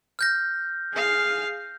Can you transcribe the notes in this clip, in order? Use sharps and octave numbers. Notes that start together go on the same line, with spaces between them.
F6 G6 A#6
G#4 F5